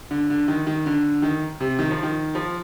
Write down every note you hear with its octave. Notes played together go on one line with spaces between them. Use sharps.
D3
D3
D#3
D#3
D3
D#3
C3
D#3
F3
D#3
F3